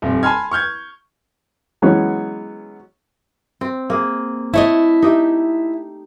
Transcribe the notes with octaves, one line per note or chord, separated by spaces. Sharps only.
D#1 F2
G#5 A5 B5 C6 F6 G#6
C#6 F6 G6 G#6
E3 F#3 G#3 B3 C#4
C4
A#3 G#4
A3 E4 C#5 D#5
D#4 G4 E5